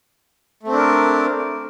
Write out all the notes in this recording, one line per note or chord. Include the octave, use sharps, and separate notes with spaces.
A3 C4 D4 A#4